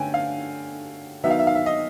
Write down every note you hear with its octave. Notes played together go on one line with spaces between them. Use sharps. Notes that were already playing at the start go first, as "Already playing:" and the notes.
Already playing: D3 A3 C#4 G5 G#5
F5
D#3 F#3 B3 D#4 E5
F5
E5
F5
E5
D#5